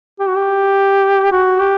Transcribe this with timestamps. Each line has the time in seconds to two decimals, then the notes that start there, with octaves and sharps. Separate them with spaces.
0.20 G4
0.28 F#4
0.36 G4
1.32 F#4
1.60 G4